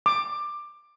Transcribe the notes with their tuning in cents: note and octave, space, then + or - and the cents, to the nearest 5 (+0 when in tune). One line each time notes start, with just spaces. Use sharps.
D6 +15